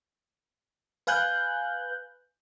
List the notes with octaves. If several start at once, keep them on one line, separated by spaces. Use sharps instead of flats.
B4 F5 G#5 F#6 G6